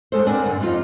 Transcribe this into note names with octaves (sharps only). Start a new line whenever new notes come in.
G#3 A4 C5
C4 D4 A#4 B4 F#5 G#5
G2 D3
F2 G3 D#4 F4